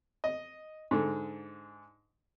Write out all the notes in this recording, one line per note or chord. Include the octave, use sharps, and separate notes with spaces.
D#5
G#2 D3